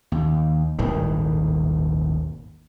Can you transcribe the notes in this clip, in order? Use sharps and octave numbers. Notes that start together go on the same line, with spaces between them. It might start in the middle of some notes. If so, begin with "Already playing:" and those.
D#2
D#1 G#1 A2 D#3